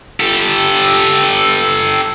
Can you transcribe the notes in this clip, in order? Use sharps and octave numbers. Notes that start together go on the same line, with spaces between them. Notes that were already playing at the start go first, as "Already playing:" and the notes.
G4 A4